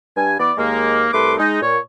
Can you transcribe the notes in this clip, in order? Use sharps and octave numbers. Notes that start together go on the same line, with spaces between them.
G2 G#5
E3 B3 D5
D#2 G#3 A#3
C2 A3 B4 C6 D6
G#3 D#4
A#2 C#5